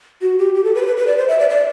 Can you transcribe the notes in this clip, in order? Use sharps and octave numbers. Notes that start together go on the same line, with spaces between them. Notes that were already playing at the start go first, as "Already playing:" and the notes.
F#4
G4
G4
A4
B4
C5
B4
B4
D5
C5
E5
D5
D5